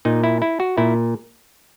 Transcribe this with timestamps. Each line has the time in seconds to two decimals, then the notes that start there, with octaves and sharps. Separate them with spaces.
0.05 A#2 D#4
0.24 E4
0.42 E4
0.60 F#4
0.78 A#2 E4